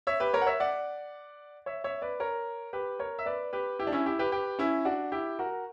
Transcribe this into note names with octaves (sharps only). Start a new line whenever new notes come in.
C#5 E5
G4 B4
A#4 C#5
F#5
C#5 E5
D5 F#5
C#5 E5
C#5 E5
B4 D5
A#4 C#5
G4 B4
A#4 C#5
E5
B4 D5
G4 B4
E4 G4
D4
C#4 E4
E4 G4
G4 B4
G4 B4
C#4 E4
D4 F#4
E4 G4
F#4 A#4